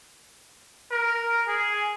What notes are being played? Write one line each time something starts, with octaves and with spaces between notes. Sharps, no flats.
A#4
G#4